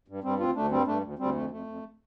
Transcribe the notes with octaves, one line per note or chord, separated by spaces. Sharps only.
G2
G2 G3 C4
D2 C4 F4
D2 A3 D4
G2 G3 C4
G2 A3 D4
D2
D2 G3 C4
F2 A3
F2 A3
F2